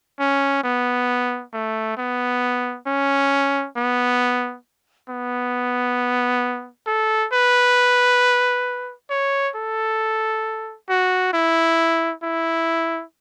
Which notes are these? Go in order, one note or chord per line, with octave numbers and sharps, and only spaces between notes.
C#4
B3
A3
B3
C#4
B3
B3
A4
B4
C#5
A4
F#4
E4
E4